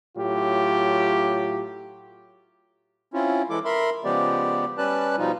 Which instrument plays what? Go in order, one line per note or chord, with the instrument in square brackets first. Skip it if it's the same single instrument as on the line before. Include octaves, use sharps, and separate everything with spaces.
[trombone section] A2 F#3 F4 G4
[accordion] C4 C#4 E4 F4
E3 G#3 E4 A4 D6
A#4 E5 B5 C6
C#3 F3 G#3 B3 G4 D5
G3 C#4 B4 D5 A5 F#6
B2 F3 G3 D#4 F4